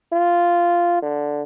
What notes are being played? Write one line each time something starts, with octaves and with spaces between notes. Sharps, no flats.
F4
D3